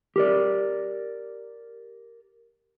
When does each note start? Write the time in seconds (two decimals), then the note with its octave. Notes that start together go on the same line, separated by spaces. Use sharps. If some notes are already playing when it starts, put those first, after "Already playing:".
0.16 G4 A#4 D5